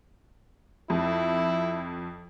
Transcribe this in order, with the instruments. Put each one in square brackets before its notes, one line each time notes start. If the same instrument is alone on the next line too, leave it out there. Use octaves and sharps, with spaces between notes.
[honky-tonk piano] F2 [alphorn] E4